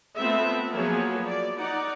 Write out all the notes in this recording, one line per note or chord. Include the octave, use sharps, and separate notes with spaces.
A3 B3 C4 F4 E5
F3 F#3 A#3 B3 G#4 C#5
D5
D#4 D5 F#5